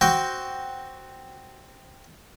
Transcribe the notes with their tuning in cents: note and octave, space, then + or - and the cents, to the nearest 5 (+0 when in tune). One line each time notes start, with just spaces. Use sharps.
C4 +0 F#4 +10 G5 +0